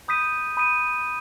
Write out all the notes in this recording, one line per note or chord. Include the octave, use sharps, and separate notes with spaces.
B5 D#6 G6 B6 D#7
B5 D#6 G6 B6 D#7